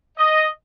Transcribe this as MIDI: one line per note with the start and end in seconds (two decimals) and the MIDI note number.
0.18 0.46 75